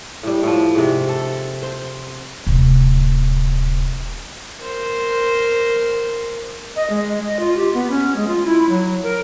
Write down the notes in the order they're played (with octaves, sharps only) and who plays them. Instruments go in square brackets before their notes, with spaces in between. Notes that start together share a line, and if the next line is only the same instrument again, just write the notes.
[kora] A2 G3
A2 F3
G#2 C3
A4
C5
[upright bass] D1 C3
[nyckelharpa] A#4 C5
[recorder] D#5
G#3
D#5
F4
G4
B3
C#4
G#3
F4
E4
F#3
A#4